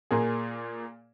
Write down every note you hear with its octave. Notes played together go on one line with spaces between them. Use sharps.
A#2 A#3 G#4